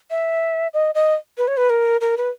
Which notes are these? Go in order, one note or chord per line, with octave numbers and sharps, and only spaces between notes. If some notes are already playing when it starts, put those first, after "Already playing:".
E5
D#5
D#5
B4
C#5
B4
A#4
A#4
B4